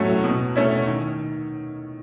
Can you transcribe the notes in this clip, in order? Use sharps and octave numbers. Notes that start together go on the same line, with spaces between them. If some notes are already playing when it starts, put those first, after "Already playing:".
Already playing: A2 F#3 A3 C#4
B2
A3 C#4 E4
D#3